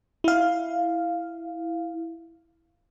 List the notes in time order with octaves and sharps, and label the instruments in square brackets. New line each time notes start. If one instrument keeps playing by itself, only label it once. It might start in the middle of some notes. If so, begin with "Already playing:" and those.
[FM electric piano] E4 F5